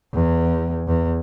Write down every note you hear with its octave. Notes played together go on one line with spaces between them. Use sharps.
E2
E2